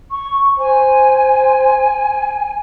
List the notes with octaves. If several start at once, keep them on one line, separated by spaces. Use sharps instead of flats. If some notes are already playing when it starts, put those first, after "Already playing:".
C#6
C5 G#5